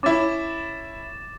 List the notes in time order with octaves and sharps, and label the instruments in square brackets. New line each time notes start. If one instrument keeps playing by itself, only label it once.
[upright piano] C#4 E4 [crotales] D6 A6 E7